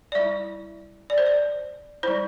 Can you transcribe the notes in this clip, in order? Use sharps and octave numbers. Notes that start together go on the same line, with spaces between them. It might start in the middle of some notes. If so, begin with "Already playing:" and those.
D5
G3 E4 E5
D5
C5
D5
G3 E4 C5